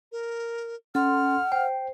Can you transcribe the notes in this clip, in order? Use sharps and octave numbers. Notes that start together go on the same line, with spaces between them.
A#4
C#4 A4 F#5 C6 F6
C5 G5